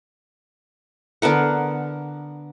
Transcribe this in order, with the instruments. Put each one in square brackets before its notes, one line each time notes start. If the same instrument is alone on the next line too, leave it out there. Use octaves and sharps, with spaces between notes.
[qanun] D3 B3 A#4 F#5